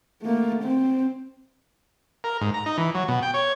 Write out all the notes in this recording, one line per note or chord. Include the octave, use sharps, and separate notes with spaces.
A3 A#3
C4
A#4
G#2
A#5
D#4
E3
F#3
B2
G5
C#5